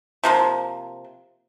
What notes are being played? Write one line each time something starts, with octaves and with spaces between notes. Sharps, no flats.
C3 F3 A#3